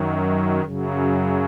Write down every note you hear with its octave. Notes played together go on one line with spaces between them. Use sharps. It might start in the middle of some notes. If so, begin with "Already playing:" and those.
Already playing: F#2 D#3 F#3
F#2 C#3 F#3